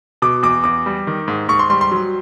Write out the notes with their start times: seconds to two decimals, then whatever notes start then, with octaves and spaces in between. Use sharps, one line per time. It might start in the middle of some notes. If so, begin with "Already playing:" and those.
0.22 B2 D6
0.43 E2 D6
0.64 E2 D6
0.86 G3
1.07 D#3
1.28 G#2
1.48 G#2 C#6
1.59 C6
1.70 G3 C6
1.81 C6
1.91 F#3